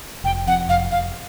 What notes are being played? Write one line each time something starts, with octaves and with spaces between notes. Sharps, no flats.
F1 G5
F2 F#5
F1 F5
F1 F5